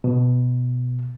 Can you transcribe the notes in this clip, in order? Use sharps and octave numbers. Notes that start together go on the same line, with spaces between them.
B2